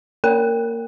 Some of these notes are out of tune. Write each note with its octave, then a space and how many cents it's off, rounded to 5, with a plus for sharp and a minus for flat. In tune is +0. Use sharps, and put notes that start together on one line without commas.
A#3 -15 A#4 -15 G5 +25